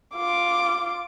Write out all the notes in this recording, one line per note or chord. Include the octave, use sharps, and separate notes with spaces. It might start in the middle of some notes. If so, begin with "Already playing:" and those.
F4 D6